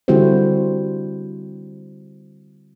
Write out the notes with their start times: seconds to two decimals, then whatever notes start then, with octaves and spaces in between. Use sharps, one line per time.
0.08 D3 G3 C4 E4 F#4 C5